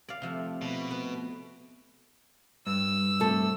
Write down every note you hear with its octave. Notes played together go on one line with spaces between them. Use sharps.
D5 F5
C3 F3 A3
B2
B4
G2 E6
C3 A3 A4